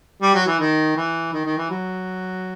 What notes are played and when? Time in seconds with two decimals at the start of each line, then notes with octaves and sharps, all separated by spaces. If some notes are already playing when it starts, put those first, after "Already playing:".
0.22 G3
0.34 F#3
0.47 E3
0.59 D#3
0.96 E3
1.33 D#3
1.46 D#3
1.57 E3
1.70 F#3